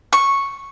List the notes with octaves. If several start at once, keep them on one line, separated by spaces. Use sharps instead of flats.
C#6